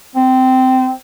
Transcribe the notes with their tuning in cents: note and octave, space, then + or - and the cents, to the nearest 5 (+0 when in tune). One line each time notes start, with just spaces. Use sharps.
C4 -15